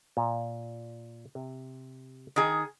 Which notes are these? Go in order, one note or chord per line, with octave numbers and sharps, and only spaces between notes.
A#2
C3
D#3 G#4